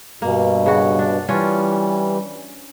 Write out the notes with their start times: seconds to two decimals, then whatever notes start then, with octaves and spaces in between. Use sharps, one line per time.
0.22 G2 B2 A#3
0.66 C#3 F#4
0.99 D4
1.29 E3 G3 C#4 D4 F4